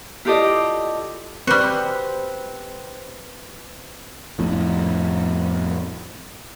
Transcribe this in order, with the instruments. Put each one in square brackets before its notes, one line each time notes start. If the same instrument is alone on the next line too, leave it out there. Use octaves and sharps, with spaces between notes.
[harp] E4 F4 G4 A4 D5 D#5
[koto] G3 F#4 [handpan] C4 B4 C5
[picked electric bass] F2 A2